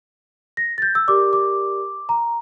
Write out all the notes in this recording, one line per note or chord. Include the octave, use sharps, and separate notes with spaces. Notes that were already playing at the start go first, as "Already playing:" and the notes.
A#6
A6
G6
E6
G4 A#4 D5 D6
D6
A#5